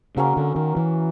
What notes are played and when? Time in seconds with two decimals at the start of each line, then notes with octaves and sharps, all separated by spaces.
0.17 C#3 F#3 A#3 C#4
0.37 D3
0.56 D#3
0.76 E3